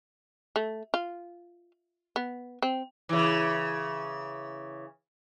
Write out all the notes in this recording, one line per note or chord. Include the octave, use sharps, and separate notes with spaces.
A3
F4
B3
C4
C#3 E3